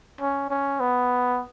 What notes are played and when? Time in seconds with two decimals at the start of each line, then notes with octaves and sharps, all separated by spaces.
0.21 C#4
0.50 C#4
0.80 B3